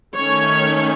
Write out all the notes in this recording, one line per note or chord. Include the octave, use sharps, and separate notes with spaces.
D#3 A3 C#4 C#5